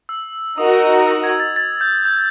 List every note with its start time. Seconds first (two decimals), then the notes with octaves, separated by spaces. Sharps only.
0.09 E6
0.58 D#4 F#4 A#4 D#5 D#6
1.07 E6
1.24 G#6
1.40 A6
1.56 A6
1.81 G6
2.05 G6